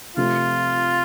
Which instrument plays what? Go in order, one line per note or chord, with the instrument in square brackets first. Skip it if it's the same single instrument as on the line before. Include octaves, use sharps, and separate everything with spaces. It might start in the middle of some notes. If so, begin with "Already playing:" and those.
[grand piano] C3 F3 A3 [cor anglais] F4